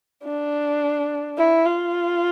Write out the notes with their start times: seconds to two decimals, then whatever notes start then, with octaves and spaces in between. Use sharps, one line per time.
0.24 D4
1.38 E4
1.65 F4